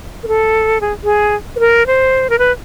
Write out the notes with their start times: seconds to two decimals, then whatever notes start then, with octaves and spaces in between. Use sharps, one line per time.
0.23 A#4
0.28 A4
0.81 G#4
1.04 G#4
1.56 B4
1.60 A#4
1.87 C5
2.30 A#4
2.39 B4